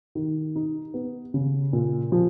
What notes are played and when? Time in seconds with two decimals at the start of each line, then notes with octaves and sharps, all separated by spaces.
0.15 D#3
0.56 D#4
0.94 B3
1.34 C#3
1.73 A#2
2.12 F3